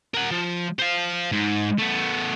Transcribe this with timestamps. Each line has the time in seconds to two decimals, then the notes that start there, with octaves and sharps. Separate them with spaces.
0.14 A#4 F#5
0.31 F3
0.79 C5 F5
1.32 G#2
1.79 A3 B3